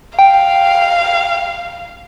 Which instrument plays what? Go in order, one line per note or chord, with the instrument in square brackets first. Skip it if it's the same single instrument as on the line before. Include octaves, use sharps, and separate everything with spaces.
[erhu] F5 [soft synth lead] G5